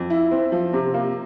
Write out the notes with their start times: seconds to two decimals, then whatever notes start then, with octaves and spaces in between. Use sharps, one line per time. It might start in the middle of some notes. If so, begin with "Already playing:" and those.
Already playing: F2
0.10 E4
0.31 C4
0.52 F3
0.73 C3
0.94 A#3